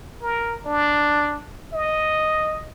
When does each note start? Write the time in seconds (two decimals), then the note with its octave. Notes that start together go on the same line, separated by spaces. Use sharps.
0.22 A#4
0.66 D4
1.73 D#5